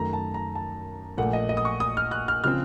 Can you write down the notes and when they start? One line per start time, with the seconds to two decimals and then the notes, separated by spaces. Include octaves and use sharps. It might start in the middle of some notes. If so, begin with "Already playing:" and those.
Already playing: F#2 D#3 A3 A#5
0.13 A5
0.34 A#5
0.55 A5
1.18 A#1 A#2 A3 F#5
1.33 D#5
1.49 D#5
1.57 D#6
1.65 C#6
1.80 D#6
1.97 F6
2.11 F#6
2.28 F6
2.44 C#3 F3 C4 F6